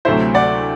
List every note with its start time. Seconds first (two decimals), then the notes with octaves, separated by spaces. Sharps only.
0.05 D2 C3 F#3 A3 E4 C5 E5
0.34 D5 F#5